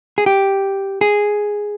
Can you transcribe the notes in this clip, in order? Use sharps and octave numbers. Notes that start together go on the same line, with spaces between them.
G#4
G4
G#4